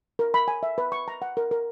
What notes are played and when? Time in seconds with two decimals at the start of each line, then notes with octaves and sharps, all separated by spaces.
0.19 A#4
0.34 B5
0.48 G#5
0.63 E5
0.78 B4
0.92 C#6
1.08 A#5
1.22 F#5
1.37 A#4
1.51 A#4